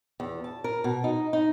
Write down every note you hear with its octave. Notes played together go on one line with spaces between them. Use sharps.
E2
A5
A#4
B2
D#4
D#4